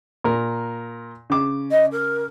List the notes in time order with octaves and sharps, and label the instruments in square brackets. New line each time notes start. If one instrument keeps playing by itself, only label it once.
[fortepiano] A#2 A#4
C#3 D6
[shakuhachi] D#5
A#4